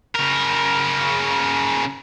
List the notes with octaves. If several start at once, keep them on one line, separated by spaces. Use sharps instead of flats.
C#3 A#4